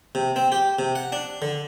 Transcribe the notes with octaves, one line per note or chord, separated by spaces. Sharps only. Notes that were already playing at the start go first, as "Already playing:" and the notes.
C3
C4
G4
C3
F#5
D4
D3